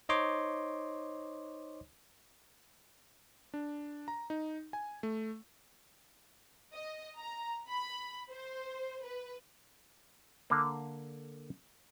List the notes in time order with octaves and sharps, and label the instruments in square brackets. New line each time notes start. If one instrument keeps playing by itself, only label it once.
[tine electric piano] D#4 C5 C#5 D#5 C6 D6
[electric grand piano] D4
A#5
D#4
G#5
A3
[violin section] D#5
A#5
B5
C5
B4
[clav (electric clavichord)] D3 A#3